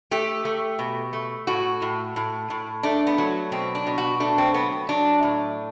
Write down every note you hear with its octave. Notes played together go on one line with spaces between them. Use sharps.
A3 G4
A3
B2
A3
A2 F#4
A2
A2
A2
A3 D4
B3
F#3
B2 C4
D4
B2
F#4
A3 D4
C4
F#3 B3
F#3 D4
A2